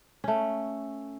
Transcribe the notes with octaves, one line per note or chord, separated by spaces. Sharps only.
A3 C#4